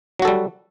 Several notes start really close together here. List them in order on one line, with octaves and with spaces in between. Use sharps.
F#3 F#4 A4 G3